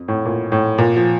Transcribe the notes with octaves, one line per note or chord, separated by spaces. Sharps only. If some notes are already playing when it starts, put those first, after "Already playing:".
Already playing: F2
A2
A#2
A2
A#2
F3